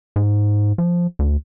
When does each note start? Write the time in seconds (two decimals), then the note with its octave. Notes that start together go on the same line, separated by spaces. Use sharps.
0.16 G#2
0.78 F3
1.19 D2